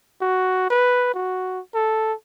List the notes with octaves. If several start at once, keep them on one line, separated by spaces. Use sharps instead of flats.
F#4
B4
F#4
A4